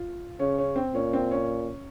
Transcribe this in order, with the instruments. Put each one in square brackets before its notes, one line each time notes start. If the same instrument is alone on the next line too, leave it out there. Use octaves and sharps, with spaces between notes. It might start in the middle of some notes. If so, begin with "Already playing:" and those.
Already playing: [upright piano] F4
[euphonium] C#3 [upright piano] C#4
[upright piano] C#4
C4
[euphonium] A#2 [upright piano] C#4
[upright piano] C4
C#4